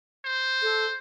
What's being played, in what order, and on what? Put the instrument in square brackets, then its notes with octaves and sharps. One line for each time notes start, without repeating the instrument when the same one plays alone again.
[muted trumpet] C5
[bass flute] A4